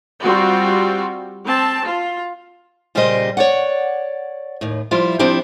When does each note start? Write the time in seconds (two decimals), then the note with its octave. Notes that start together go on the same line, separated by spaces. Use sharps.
0.23 G3 C4 F4 F#4
1.47 C4 A5
1.87 F4
2.95 A#2 C#3 G3 G4 C5 D#5
3.37 C#5 D5 F#5
4.61 D#2 A2
4.91 F3 G3 E4 F4
5.19 F3 C4 D4 E4 G4